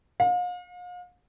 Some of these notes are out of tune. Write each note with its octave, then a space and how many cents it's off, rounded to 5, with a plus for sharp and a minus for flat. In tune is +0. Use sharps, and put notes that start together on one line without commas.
F5 +40